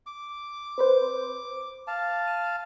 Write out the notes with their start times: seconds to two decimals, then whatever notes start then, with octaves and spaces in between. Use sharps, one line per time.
0.06 D6
0.78 C4 B4 C5
1.87 F5 A5
2.28 D#7